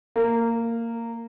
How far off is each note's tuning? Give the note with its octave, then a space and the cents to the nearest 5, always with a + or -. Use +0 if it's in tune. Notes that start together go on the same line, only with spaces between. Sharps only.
A#3 -15